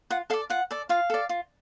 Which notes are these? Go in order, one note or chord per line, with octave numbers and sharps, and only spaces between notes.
F4 F#5
A4 D5 F5
F4 F#5
A4 D5
F4 F5
A4 D5
F4